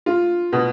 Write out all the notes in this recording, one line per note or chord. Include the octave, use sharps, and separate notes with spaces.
F4
B2